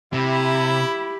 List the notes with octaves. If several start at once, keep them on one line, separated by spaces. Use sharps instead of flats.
C3 E4 G4 B5